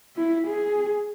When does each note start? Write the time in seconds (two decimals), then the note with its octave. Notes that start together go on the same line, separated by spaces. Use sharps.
0.17 E4
0.47 G#4